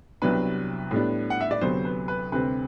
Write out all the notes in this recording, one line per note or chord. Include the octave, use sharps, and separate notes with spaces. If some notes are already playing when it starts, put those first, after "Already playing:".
C2 C3 F#3 B3 D4 B4
A2 G3 B3 D4
F#5
E5
D5
D2 C3 F#3 B3 C5
B4
B4
D2 C3 G3 C4 B4